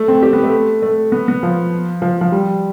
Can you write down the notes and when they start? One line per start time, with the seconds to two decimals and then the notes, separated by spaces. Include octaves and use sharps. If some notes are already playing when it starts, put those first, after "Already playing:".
Already playing: A3
0.08 C4
0.23 G4
0.33 B3
0.43 A3
0.82 A3
1.12 B3
1.28 B3
1.43 F3
2.02 F3
2.21 F3
2.32 G3